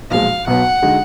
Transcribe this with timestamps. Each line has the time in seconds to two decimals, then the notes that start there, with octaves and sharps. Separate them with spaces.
0.10 B1 A#2 F3 G#3 F5
0.47 B1 B2 F#3 B3 F#5
0.82 D3 G#3 D#4 F#4